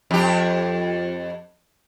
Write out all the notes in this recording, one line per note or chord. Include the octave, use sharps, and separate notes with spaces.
F2 G4